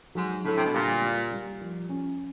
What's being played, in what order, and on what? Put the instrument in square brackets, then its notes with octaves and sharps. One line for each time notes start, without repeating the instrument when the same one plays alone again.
[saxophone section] G#2 [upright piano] F#3
[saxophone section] A2 [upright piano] D3
[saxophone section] C3
B2
[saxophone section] A#2 [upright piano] G3
[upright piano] G3
G3
F3
C#4